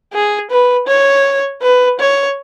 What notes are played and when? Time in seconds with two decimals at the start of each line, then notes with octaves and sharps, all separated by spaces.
0.13 G#4
0.51 B4
0.88 C#5
1.62 B4
1.99 C#5